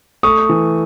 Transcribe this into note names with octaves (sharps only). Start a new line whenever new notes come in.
A3 C#6 D#6
E3